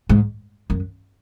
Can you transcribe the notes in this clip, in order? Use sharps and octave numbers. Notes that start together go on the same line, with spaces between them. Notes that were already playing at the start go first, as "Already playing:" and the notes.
G#2
F#2